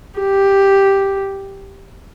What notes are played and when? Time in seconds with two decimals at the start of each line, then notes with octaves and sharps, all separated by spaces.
0.19 G4